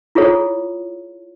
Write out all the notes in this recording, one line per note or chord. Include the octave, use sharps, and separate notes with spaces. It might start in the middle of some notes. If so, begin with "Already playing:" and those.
E4 F4 G#4 A4 C#5